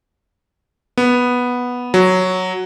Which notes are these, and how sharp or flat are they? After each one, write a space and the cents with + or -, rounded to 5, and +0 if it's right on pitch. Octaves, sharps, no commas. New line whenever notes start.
B3 -5
F#3 +0